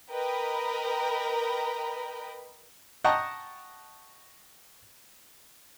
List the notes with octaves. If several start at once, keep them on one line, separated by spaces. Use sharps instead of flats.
A#4 B4 D#5 G5 B5
D#5 F#5 G5 A5 A#5 C#6